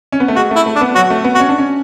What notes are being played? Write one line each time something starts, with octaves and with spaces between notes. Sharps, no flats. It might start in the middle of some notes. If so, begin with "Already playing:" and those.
C#4
B3
A3
G#3 F#4
A3 E4
A3
D4
B3
F#3 F#4
A3
B3
F#4
C#4
D4
C#4